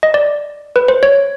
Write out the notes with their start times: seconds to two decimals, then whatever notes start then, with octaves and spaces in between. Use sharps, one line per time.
0.03 D#5
0.14 D5
0.76 B4
0.88 C5
1.03 C#5